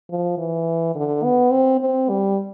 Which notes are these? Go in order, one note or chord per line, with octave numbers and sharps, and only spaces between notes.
F3
E3
D3
B3
C4
C4
G3